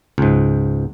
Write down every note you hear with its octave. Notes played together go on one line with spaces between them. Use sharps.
C#2 G#2